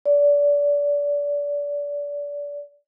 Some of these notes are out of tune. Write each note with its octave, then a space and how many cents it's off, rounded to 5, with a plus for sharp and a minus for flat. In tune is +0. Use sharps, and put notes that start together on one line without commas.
D5 -25